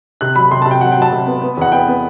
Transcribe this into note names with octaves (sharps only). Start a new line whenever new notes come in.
C3 F#6
F#3 B5
C3 C6
A5
C3
G5
F#3 F#5
G5
F#3
A5
C3
B3
B3
E2 F#5
B3 G5
B3